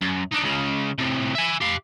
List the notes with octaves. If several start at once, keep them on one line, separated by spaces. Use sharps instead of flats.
F#2
D4 D#4
C#2 C#3
A2 C3
E5 G#5
G4 F5